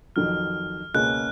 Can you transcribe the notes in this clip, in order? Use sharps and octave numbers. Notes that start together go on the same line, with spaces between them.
F2 D#3 F#3 F6
C#2 B2 A#3 C#4 G#4 F#6